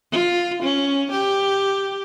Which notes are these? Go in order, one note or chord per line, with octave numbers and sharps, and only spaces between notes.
F4
C#4
G4